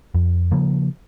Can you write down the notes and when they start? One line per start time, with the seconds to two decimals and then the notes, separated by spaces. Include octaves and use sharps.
0.15 F2
0.51 C#3 F3 A#3